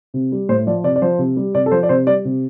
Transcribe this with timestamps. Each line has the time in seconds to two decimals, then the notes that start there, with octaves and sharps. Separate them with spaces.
0.14 C3
0.32 G3
0.49 A2 C5
0.67 F3 D5
0.84 C3 D5
0.96 D5
1.02 F3 C5
1.19 C3
1.37 G3
1.55 C3 D5
1.66 A4
1.71 F3 C5
1.83 D5
1.89 C3 C5
2.06 G3 D5
2.25 C3